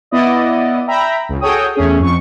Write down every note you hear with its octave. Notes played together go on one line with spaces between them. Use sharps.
B3 E4 D5 D#5
E5 G5 A#5 B5
C#2
F#4 G#4 A4 C#5 G5 D#6
E2 A3 C#4 G#4
F2 C#6